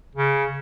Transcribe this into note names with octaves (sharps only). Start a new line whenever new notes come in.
C#3